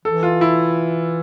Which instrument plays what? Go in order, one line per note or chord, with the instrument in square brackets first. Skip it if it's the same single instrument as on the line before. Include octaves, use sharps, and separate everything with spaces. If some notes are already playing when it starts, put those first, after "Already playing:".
[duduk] E3 [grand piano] A4
[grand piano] F4
E4